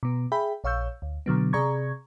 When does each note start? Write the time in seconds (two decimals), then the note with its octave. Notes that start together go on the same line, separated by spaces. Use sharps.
0.03 B2 B3
0.32 G#4 E5 G5 B5
0.64 A#1 C#5 F5 C#6 E6 G6
1.02 D2
1.26 B2 D3 F#3 B3
1.53 C3 G#4 D5 A#5 C#6 G#6